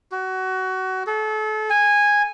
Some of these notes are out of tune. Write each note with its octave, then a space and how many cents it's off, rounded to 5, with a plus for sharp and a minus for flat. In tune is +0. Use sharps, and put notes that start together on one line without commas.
F#4 +25
A4 -35
G#5 -10